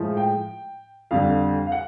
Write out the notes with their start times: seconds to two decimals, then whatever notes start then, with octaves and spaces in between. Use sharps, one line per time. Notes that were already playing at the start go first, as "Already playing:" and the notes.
Already playing: A2 F3 G#3
0.17 G5
1.11 F2 D3 G3 F5
1.66 F5
1.72 F#5